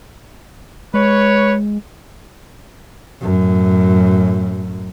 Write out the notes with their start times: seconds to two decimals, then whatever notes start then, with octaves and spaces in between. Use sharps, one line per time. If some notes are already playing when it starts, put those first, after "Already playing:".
0.94 G#3 B4 C#5
3.21 F#2 A2